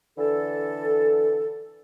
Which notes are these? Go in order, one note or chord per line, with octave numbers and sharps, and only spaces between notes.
D3 E3 A4